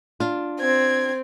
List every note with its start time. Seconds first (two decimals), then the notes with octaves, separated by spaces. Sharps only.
0.20 D4 F4
0.61 C4 G#6